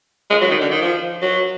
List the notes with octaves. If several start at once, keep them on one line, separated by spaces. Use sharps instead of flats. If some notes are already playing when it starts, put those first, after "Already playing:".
G#3
F#3
D#3
D3
D#3
F3
F#3